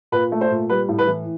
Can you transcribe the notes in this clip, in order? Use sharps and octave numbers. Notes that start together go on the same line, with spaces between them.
A#2 B4
A3
C5
A#2
G3 B4
A2
B4
E3